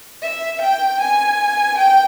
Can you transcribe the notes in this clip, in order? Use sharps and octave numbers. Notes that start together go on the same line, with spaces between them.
E5
G5
G#5
G5